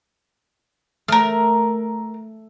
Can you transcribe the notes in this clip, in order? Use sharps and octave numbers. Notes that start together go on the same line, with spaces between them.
A3 A#4 F6